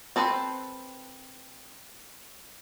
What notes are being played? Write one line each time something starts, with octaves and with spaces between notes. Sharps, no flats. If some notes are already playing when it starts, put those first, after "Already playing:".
C4 A4 B4 C5